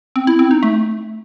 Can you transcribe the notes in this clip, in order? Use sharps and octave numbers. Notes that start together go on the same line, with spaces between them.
C4
E4
C4
D#4
A3